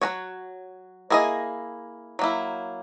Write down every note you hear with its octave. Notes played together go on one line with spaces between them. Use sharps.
F#3 C#4 F#4 C#5
A#3 E4 G#4 D#5
F#3 A#3 E4